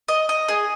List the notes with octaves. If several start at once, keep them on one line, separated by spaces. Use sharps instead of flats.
D#5
D#5
G#4